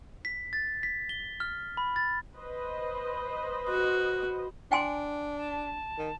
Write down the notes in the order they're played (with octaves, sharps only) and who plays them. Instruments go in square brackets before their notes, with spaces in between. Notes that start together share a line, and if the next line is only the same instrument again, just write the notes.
[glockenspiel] B6
A6
B6
G7
F6
B5
A6
[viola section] B4 C5 D#5
[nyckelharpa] F#4
[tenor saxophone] D4 [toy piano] G5 G#5 C6
[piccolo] A5
[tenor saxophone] D#3